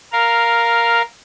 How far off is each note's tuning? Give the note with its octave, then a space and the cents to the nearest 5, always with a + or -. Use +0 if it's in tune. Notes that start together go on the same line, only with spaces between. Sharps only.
A#4 +0 F5 -5